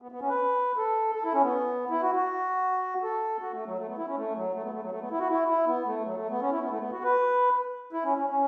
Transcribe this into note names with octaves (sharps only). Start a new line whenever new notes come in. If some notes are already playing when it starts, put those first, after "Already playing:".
B3
B3
C#4
B4
A4
A4
E4
C#4
B3
E4
F#4
F#4
A4
F#4
A3
F#3
A3
B3
E4
C#4
A3
F#3
A3
B3
A3
F#3
A3
B3
E4
F#4
E4
E4
B3
A3
F#3
A3
B3
C#4
E4
B3
A3
B3
F#4
B4
E4
C#4
C#4
C#4